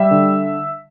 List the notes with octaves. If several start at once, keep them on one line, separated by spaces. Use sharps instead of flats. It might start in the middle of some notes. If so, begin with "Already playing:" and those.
Already playing: G3 E5
D3